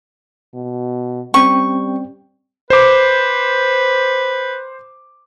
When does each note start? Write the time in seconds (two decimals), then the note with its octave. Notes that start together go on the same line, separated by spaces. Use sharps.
0.54 B2
1.34 G3 C4 C#4 G5 C#6
2.70 B4 C5 D6